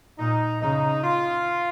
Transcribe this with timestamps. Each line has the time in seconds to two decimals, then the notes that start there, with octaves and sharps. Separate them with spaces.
0.19 A#2 D#4
0.61 C#3 D#4
1.04 F4